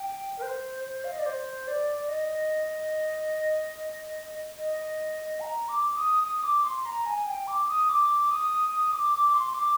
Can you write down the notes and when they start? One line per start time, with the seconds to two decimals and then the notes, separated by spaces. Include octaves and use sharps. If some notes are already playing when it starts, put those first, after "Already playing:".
Already playing: G5
0.38 A#4
0.42 C5
0.85 C5
1.04 F5
1.12 D#5
1.19 D5
1.26 C5
1.68 D5
2.09 D#5
4.57 D#5
5.40 A#5
5.68 D6
5.96 D#6
6.24 D#6
6.43 D6
6.64 C6
6.86 A#5
7.06 G#5
7.26 G5
7.47 D6
7.68 D#6
7.89 D6
8.31 D#6
8.71 D#6
8.92 D6
9.13 D6
9.34 C6
9.54 D6